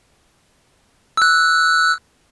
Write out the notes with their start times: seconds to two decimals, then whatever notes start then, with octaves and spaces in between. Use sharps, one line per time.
1.17 E6 F#6